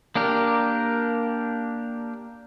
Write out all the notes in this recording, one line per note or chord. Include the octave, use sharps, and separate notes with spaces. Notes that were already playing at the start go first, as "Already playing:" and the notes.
A#3 D4 G4 A#4